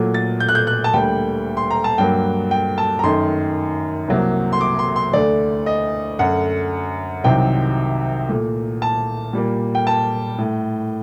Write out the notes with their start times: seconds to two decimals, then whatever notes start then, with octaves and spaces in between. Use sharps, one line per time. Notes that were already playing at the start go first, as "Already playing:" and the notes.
Already playing: A#2 F#3 A3
0.14 A6
0.40 G6
0.49 F#6
0.55 G6
0.67 F#6
0.84 A5
0.93 D2 D3 G3 A#3 G5
1.57 C6
1.71 A#5
1.84 A5
1.98 G2 F#3 A#3 G5
2.51 G5
2.78 A5
2.99 A#5
3.03 F#2 D#3 A3 C6
4.08 C2 C3 F#3 A#3
4.53 C6
4.61 D6
4.79 C6
4.96 C6
5.13 D2 D3 A3 D5
5.66 D#5
6.19 F#2 D3 A3 F#5
7.24 C2 C3 D#3 F#3 G5
8.29 A#2 A3
8.82 A5
9.33 A#2 G3 A#3
9.75 G5
9.87 A5
10.38 A2 A3